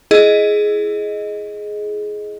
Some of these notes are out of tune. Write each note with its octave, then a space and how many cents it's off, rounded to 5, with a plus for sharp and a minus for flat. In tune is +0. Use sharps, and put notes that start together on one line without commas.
E4 +10 G#4 +15 D#5 +0